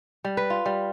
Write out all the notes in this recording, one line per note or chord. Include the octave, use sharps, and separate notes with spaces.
G3
B4
F4
G3